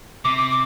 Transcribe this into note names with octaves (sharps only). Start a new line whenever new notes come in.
C3 D6
D6
D6